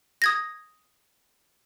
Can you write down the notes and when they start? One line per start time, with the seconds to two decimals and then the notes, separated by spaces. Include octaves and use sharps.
0.22 D#6 G#6 A#6